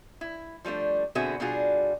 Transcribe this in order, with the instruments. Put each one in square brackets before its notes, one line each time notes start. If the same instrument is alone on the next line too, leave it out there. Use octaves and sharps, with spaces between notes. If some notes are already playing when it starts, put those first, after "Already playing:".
[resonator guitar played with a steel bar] E4
F3 G3 A3 D4
B2 D3 C4 F#4 G#4 E5
B2 G3 D4 F4 F#4 G#4